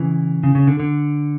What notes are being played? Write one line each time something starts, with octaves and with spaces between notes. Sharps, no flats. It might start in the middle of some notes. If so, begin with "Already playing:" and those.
Already playing: C#3 E3
C#3
C#3
D3
D3